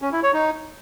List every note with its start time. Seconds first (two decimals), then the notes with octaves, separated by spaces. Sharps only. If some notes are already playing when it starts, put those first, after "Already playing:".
0.02 C#4
0.12 E4
0.23 C#5
0.34 D#4